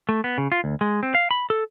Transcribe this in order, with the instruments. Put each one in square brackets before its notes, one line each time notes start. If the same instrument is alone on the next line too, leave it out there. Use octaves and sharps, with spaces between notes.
[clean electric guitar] A3
B3
C#3
F4
D2
G#3
C4
F5
B5
A4